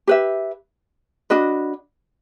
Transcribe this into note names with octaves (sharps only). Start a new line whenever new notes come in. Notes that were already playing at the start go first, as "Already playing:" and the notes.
G4 B4 E5
D4 F#4 B4 D#5